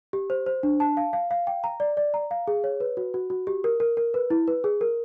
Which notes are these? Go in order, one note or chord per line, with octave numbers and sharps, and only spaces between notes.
G4
C5
C5
D4
A5
F5
F5
F5
G5
A#5
D5
D5
A#5
F5
G#4
C#5
B4
F#4
F#4
F#4
G4
A#4
A#4
A#4
B4
E4
B4
G#4
A#4